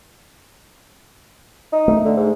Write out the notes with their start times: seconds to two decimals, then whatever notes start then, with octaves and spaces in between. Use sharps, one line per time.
1.73 D#4
1.88 A3
2.05 D3
2.17 G#2